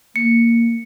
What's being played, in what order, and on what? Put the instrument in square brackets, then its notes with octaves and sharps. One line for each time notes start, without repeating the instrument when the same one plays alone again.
[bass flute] A#3 [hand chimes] C#7